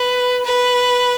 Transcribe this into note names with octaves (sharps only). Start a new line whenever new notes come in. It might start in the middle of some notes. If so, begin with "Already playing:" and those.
Already playing: B4
B4